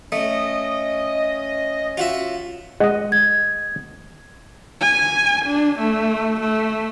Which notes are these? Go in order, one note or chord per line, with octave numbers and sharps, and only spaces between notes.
A3 C#4 D#5
F4 F#4 E5
G#3 D#5 F#5
G#6
G#5
D4
A3
A3